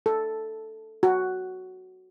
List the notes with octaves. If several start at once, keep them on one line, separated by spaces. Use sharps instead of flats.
A4
F#4